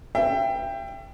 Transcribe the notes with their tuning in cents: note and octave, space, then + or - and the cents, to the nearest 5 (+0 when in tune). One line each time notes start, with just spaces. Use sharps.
E5 +35 G5 +10